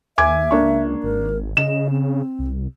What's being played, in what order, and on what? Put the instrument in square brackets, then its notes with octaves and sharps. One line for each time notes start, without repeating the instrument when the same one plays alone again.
[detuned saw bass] D#2 [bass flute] E5 [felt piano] G#5 D6 G#6
[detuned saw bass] C#2 [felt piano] A#3 D4 C#6
[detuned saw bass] G#1 [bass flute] A#4
[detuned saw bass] C#3 [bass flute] D#5 [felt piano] E7
[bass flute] C4
[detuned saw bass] C2